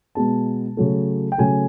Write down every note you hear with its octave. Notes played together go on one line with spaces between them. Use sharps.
B2 G#3 B3 A5
C#3 F#3 A3
G5
C#3 F#3 A3 G#5